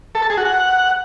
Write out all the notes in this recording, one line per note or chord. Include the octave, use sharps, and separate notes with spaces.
A4
A5
G#4
F#4
F#5